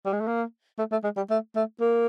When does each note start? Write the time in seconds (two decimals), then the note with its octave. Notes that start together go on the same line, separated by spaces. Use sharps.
0.06 G3
0.13 G#3
0.21 A3
0.27 A#3
0.79 A3
0.92 A3
1.04 G#3
1.17 G3
1.30 A3
1.56 A3
1.81 A#3